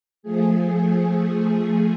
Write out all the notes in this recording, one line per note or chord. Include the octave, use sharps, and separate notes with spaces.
F3 A3 G#4